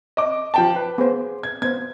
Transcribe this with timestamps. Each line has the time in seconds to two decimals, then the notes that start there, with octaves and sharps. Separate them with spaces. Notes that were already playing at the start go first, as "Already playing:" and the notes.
0.17 D#5 D6
0.54 F3 G5 A5
0.76 B4
0.98 B3 G#4 C5
1.43 G#6
1.62 B3 C5 G#6